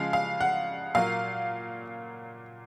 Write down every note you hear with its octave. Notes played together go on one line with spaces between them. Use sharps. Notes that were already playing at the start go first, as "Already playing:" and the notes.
Already playing: C#3 F3 G#3 F5
F5
F#5
A#2 F#3 A#3 F5